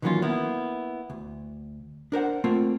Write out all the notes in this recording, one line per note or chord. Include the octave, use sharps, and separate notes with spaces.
D#3 E3 F#3 A#3 C#4 F4
A#3 B3 E4
D2
D4 A#4 C5 F#5
A3 A#3 C4 F4